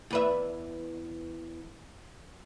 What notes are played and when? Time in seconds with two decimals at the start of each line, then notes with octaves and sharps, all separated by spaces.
0.10 E2 B4 E5